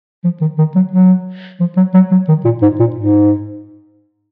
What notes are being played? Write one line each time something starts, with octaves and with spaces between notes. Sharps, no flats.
F3
D#3
D#3
F#3
F#3
F3
F#3
F#3
F#3
D#3
A#2
G#2
A#2
G#2